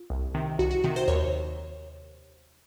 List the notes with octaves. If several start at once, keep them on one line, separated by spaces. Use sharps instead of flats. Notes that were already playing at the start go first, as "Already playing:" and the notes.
Already playing: F4
C2
C3 D#3
C2 F#4
F#4
C3 D#3 F#4
C5
D#2 C#5